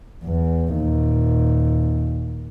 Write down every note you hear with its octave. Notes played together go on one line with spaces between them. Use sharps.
E2
D#2 A#2